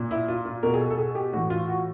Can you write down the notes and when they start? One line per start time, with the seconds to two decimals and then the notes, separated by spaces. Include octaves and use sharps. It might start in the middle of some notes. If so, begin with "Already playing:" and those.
Already playing: A#2
0.11 E4
0.28 F4
0.46 F4
0.63 B2 A#4
0.74 G#4
0.80 A4
0.90 A4
0.98 G#4
1.15 G4
1.33 A2 E3 F#4
1.50 F4
1.68 F#4